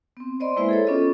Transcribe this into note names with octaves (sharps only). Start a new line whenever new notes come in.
B3 C4
C5 D5 D#5 B5 C6
G#3 A#3 E4 B4 C5 E5
G#4 A4 C#5
B3 C#4 D4 F4 A4 D#5